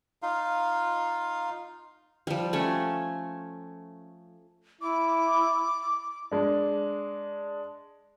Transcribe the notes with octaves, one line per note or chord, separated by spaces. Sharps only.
D#4 F4 F5
F3 G3
A3 C#4
E4 D6
G#3 D4